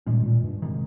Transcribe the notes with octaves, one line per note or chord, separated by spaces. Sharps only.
G2 A#2 D#3 G#3 C#4
A#2
G2
C3 D#3 G#3